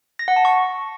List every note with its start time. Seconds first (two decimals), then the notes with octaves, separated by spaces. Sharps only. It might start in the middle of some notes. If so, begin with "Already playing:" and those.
0.19 A#6
0.28 F#5
0.36 A5
0.45 C#6